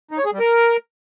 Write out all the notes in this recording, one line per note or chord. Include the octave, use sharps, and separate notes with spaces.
D#4
C#5
G#4
G3
A#4